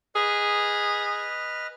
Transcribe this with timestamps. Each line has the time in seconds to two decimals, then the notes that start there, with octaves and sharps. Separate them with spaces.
0.15 G#4 B4 D#5 F6